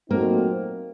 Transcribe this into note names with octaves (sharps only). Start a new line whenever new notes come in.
A#2 F#3 A3 A#3 C4 D#4